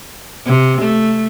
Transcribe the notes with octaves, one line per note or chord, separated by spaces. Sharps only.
C3
A3